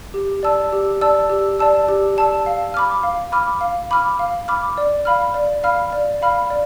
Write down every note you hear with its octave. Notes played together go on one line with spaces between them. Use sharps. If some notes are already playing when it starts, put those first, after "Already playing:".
G4
D5 A5 E6
G4
D5 A5 E6
G4
D5 A5 E6
G4
D5 A5 E6
F5
B5 D6 F6
F5
B5 D6 F6
F5
B5 D6 F6
F5
B5 D6 F6
D5
F5 B5 F6
D5
F5 B5 F6
D5
F5 B5 F6
D5